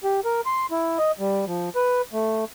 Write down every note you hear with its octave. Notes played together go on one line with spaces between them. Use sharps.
G4
A#4
C6
E4
D#5
G3
F3
B4
A3